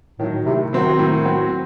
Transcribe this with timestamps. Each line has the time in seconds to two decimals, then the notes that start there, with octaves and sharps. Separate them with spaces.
0.19 A2 D#3 F#3
0.46 A2 C3
0.72 D#3 F#3 C4 F#4
0.99 A2
1.25 F#3 C4 F#4